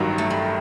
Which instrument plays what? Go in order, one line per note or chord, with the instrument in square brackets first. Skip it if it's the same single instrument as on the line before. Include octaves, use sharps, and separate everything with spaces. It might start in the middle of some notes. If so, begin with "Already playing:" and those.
Already playing: [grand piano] A1 G2 D#3 F#3
[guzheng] A3
G3